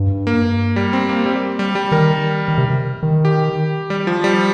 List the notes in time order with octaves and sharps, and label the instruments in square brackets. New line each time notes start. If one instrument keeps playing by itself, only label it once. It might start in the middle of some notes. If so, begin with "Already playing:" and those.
Already playing: [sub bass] G2
[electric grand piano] A#3
G3
C4
A#3
G3
G3
G3
[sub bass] D#3 [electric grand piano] A#4
[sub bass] D#3
C3
D#3
[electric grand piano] G4
G3
F3
G3